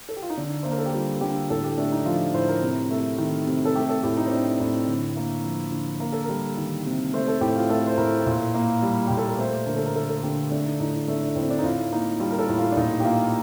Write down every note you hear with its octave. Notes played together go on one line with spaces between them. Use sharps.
A4
G4
F4
D#4
D3 D4
A#3 C5
A#4
A4
G4
G3 F4
D3 G4
A2 A4
G4
A3 D4
D#4
F3 F4
A2 C5
A#4
C3
A3
D#3
C3
A4
A3 G4
A4
A2 G4
D#4
C4
A3 D4
A2
D3
A#3
F3
D3
A#3 A#4
A4
A#4
G3
D#3
C3
A3 C5
A4
A2 G4
F4
A3 A4
C5
A2 A#4
A#2
A#3
G3
A#2 G4
A4
A#4
A3 C5
D3 A#4
A4
A#4
A3 A4
A4
D3 G4
A3 D4
D#4
A2 D#4
D#4
A3 D4
D4
A2 C4
D4
D#4
A2 F4
A#3 D#4
G3 F4
A#4
A4
A2
F4
D4
A#2 D#4
G4
A#3 F4